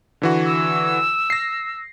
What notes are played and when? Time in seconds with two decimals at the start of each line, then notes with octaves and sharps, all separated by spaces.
0.22 D3 E3 F#4
0.46 E6
1.30 A#6 C7